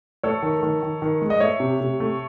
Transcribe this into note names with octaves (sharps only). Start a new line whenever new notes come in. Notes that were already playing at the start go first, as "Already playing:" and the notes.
A3 A4 C#5
D#3
D#3
D#3
D#3
G#3
D#5
A3 C#5 E5
C3
C3
A3